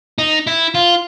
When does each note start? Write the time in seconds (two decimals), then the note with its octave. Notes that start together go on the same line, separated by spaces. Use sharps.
0.18 D#4
0.47 E4
0.74 F4